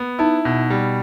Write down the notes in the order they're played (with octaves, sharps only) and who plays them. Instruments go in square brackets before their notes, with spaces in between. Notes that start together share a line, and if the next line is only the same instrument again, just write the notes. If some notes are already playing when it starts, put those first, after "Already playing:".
Already playing: [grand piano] B3
[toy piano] D#4 [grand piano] E4
[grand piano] B2
G3